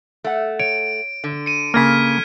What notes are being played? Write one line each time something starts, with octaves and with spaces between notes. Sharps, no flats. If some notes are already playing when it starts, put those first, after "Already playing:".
A3 F#5
C#5 D7
D3
C#7 D#7
C#3 A#3 F6 G#6 B6